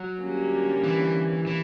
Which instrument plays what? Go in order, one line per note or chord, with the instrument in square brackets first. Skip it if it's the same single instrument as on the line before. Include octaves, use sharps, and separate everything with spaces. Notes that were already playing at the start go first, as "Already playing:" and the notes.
Already playing: [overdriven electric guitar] F#3
[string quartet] D3 G3 A#3 C#4
[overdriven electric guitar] E3
E3